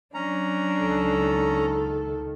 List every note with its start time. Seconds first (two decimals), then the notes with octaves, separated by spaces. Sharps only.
0.14 F#3 C#4 D4 A#5
0.80 C#2 D#3 A4